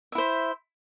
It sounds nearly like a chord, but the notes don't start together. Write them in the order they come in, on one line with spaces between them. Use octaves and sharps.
E5 E4 C5